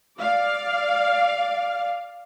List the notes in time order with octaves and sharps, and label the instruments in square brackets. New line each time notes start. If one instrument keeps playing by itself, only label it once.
[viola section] D5 F5